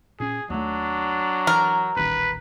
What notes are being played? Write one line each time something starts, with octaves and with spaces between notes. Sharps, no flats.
A#2 C#4 G#4
D#2 F#3 A3 D4
E3 A#4
D#1 A1 D#2 B4